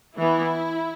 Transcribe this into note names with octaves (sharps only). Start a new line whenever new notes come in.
E3 B3 E4